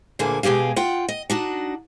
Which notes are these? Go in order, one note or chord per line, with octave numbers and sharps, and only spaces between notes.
D2 A#2 D3 A#3 G#4
B2 G#3 G4 G#4 F5
F4 F#5 G5
D#5
D4 D#4 F#4